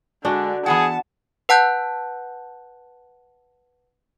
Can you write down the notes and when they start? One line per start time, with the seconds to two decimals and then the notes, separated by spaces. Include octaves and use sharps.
0.25 D3 G#3 D4 F#4
0.66 E3 B3 G#4 F#5 A5
1.49 B4 F#5 A5 F#6 G6